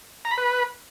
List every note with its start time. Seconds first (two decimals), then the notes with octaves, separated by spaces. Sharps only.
0.25 A#5
0.31 B5
0.38 B4